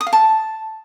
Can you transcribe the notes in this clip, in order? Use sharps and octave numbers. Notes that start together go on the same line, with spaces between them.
D#6
F5
A5